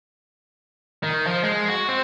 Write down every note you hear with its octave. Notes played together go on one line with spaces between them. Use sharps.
D#3
F3
G#3
F#4
C4